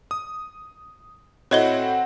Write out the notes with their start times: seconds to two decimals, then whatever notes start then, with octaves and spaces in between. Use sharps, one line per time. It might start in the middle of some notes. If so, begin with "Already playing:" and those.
0.11 D#6
1.51 A2 C4 E4 F#4 C#5 D#5 F#5 G7